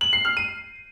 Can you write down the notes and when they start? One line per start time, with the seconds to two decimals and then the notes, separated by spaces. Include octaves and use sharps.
0.01 F#7
0.13 C7
0.25 F6
0.37 D#7